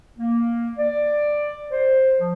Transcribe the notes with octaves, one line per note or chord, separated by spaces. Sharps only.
A#3
D5
C5
F3